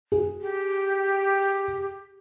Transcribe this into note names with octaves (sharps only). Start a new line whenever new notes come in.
G#4
G4